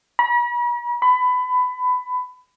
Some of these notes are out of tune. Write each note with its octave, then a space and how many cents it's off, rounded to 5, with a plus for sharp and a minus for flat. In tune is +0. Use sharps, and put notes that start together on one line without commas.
B5 -45
B5 +20